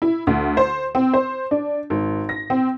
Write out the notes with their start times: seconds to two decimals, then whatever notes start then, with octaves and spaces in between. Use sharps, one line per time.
0.02 E4
0.27 D2
0.57 C5
0.95 C4
1.14 C5
1.51 D4
1.90 G#1
2.29 A#6
2.50 C4